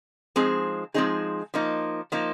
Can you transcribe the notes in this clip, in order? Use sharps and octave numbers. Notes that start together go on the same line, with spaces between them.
F3 G#3 C4 D#4 G#4
F3 G#3 C4 D#4 G#4
F3 A#3 D#4
F3 A#3 D#4